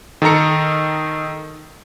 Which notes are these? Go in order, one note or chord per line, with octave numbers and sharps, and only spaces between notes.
D#3 A4 A#4 A#5 C#7